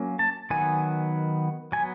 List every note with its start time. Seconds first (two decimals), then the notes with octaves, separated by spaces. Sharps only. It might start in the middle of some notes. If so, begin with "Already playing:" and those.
Already playing: F#3 A#3 C#4
0.19 A5
0.50 D#3 F#3 B3 G#5
1.72 F#3 B3 G#5